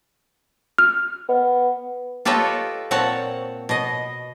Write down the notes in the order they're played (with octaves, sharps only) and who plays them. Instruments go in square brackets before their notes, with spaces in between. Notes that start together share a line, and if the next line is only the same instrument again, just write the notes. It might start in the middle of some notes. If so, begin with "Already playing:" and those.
[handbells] F6
[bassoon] B3
[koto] F4 G4 A4 B4 C#5 D#5
A#2 C4 C#5 F#5 A5
B2 D#5